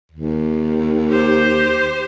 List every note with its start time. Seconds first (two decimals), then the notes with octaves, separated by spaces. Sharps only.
0.12 D#2
1.10 G4 C5